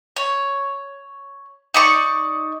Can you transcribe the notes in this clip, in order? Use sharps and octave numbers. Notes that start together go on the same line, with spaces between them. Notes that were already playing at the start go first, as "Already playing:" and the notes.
C#5
D#4 D5 C#6